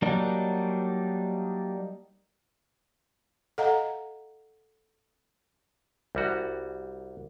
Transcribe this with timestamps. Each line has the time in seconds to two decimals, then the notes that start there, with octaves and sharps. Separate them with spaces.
0.02 F#3 G3 A#3 D4 D#4
3.58 A4 D#5 F5 F#5 A#5
6.15 C2 G3 F#4